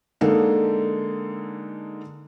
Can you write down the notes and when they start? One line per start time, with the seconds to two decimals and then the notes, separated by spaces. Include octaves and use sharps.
0.21 D3 G#3 A#3 D#4 A4